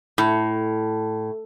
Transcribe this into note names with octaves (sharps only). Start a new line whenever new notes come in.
A2